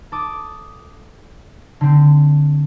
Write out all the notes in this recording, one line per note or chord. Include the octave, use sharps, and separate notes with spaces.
A4 D6 D#6
D3 C4